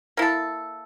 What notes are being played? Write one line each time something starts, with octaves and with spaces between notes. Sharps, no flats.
A#3 E4 A4